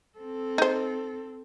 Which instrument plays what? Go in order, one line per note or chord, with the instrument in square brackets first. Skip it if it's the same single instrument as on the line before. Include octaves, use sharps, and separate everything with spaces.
[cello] C4 A4
[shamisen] D#4 C5